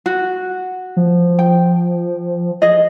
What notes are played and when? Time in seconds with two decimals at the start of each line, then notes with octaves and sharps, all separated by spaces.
0.06 F#4
0.97 F3
1.39 G5
2.62 G#4 D#5